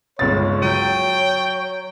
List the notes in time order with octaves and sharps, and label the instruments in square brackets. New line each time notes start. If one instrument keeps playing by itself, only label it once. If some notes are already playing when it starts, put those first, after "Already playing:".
[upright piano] G1 C#2 A6 [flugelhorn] C#5
[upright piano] F#3 D#7 [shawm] G5